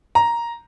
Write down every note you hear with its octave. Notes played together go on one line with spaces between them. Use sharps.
A#5